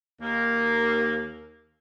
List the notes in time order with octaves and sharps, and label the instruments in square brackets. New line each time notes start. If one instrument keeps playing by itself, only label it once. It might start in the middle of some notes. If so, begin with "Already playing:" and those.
[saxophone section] D#2 A#3